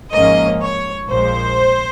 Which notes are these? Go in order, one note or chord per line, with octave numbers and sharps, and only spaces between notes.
G#1 G#2 F3 A#3 C#4 D#5
C#5
A#1 A#2 G#3 C5